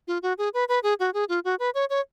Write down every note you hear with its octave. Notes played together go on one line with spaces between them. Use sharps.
F4
F#4
G#4
B4
B4
G#4
F#4
G#4
F4
F#4
B4
C#5
C#5